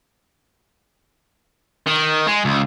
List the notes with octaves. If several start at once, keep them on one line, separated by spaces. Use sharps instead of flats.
D#3
G#3
C#2